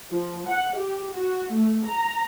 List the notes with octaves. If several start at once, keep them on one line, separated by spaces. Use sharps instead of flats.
F3
F#5
G4
F#4
A3
A#5